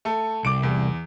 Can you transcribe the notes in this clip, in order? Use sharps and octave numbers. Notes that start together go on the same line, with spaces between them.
A3 A4
C2 D6 D7
E2